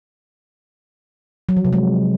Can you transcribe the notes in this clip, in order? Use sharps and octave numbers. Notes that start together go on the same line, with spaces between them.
F#3
F3
C3
G#3